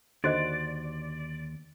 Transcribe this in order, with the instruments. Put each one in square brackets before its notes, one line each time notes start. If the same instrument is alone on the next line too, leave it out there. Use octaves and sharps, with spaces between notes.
[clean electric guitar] D#2 [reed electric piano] D3 D#3 C6 [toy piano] F#4 C5 D#5 [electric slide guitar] D5